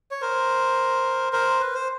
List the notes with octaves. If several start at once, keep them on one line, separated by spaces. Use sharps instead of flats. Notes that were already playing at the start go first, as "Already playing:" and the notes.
C#5
A#4 C5
A#4 C5
B4
C5